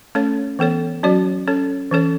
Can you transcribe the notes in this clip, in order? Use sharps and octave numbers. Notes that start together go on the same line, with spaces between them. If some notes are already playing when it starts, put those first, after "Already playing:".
A3 C#4 A4 C#5
E3 B3 A4 C#5
F#3 C#4 F#4 C#5
C#4 A4 C#5
E3 C#4 A4 C#5